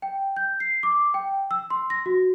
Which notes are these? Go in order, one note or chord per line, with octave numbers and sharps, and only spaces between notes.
G5
G6
C7
D6
G5
E6
C6
A#6
F#4